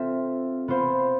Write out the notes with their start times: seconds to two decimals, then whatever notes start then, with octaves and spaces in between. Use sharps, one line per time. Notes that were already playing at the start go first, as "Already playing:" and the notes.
Already playing: C4 F4 A4 E5
0.68 B3 F4 C5 F5